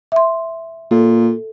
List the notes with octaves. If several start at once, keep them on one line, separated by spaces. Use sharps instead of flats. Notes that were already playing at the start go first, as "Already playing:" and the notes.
E5 C6
A#2 A4